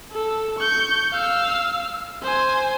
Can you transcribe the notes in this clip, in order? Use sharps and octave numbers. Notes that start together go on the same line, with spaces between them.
A4
C#6 G6
F5 E6
C5 G#5